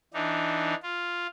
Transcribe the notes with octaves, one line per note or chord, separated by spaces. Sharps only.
E3 D4 D#4
F4